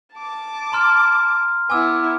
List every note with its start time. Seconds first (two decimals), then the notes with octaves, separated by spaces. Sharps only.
0.15 A5 D6
0.72 A#5 C6 F6
1.70 B3 E4 G#5 D6 E6